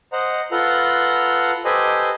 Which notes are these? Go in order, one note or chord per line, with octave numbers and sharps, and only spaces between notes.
C5 D#5 F#5 A#5
F4 A4 B4 F#5 A#5
G4 A4 B4 C5 D#5 G#5